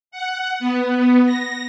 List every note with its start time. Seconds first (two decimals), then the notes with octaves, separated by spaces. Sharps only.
0.11 F#5
0.60 B3
1.26 A#6